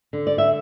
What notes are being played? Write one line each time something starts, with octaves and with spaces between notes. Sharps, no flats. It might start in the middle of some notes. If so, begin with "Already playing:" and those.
D3
D5
E5